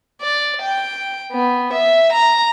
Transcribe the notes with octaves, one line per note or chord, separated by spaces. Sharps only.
D5
G5
B3
E5
A#5